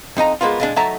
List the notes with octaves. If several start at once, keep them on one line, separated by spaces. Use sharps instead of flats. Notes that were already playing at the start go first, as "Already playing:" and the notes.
F2 D#4 D#5 A#5
G#3 A#3 B3 F4
A#2 G#3 D4
F#3 A3 D#4 E5 A5 A#5